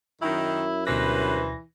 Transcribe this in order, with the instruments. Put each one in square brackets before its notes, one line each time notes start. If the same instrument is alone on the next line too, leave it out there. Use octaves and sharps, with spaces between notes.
[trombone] F#2 [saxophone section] D#3 [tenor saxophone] E4
[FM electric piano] D2 B2 A#6 [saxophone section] G2 B4 C5 [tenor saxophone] E3